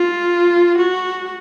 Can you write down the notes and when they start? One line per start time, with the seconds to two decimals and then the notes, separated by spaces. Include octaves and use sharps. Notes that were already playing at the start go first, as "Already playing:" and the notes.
Already playing: F4
0.78 F#4